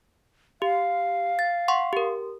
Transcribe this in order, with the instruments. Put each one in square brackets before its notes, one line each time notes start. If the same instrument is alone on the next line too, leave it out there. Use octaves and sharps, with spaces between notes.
[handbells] G4 [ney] F5
[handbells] A6
F#5 C6 C#6
G4 A#4